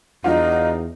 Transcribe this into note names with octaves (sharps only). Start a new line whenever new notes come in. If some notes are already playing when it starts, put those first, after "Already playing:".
E2 F#3 D4 D#4 F4